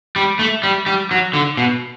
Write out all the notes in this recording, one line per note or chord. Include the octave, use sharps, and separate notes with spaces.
G3
A3
G3
G3
F#3
D3
B2